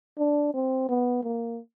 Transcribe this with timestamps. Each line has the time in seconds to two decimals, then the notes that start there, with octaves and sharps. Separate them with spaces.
0.18 D4
0.54 C4
0.89 B3
1.23 A#3